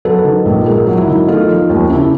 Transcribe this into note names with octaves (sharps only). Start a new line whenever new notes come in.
F#3 A4 B4
D#3
A#1
G#2 G#4 A#4
F#3
E4 F#4
D#3
A3 D#4 F4
F3
D#2
C#3 D4 E4